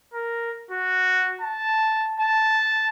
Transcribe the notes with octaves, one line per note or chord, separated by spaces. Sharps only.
A#4
F#4
A5
A5